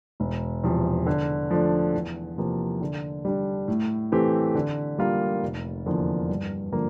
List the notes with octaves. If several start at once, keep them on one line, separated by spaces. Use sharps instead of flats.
E1
E2 C3 F3
D3
F3 A3 D4
E2
C3 F3 A#3
D3
G3 D4
A2
E3 A3 C4 G4
D3
G3 A#3 F4 A#4
F1
E2 D3 F3 A#3
G2
D3 F3 A#3